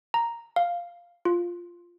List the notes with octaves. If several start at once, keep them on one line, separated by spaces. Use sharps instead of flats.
A#5
F5
F4